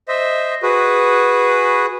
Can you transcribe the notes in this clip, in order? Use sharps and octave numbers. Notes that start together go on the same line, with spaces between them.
C5 D#5 E5
F#4 G#4 B4